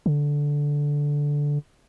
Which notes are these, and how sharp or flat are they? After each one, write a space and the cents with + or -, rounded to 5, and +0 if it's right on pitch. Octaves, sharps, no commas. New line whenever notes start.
D3 -10